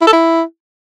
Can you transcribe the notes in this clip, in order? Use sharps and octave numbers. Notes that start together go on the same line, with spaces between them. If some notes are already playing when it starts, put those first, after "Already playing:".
E4
A4
E4